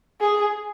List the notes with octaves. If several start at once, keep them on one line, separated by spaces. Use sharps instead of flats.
G#4